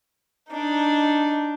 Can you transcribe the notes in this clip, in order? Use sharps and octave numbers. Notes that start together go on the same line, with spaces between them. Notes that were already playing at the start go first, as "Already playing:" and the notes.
D4 D#4